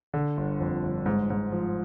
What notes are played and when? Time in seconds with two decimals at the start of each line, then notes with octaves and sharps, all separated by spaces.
0.14 D3
0.37 G1
0.60 F2
0.83 G1
1.06 G#2
1.30 G#2
1.52 F3